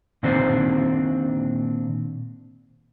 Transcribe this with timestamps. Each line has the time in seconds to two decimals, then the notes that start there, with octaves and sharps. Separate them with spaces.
0.23 A#2 D#3 C4 D4 C5